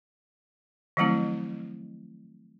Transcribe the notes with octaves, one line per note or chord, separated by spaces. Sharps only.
D#3 F3 F#3 A3 C4 E4